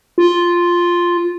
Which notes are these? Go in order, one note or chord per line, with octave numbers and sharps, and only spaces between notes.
F4